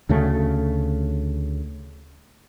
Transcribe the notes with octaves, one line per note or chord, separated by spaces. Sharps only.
D2 C#3 A3